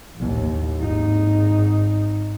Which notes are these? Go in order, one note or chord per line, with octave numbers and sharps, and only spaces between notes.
A1 D#2
G#1 D#4